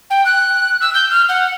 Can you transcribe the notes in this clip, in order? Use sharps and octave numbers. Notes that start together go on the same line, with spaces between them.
G5
F#6
E6
G6
F6
F#5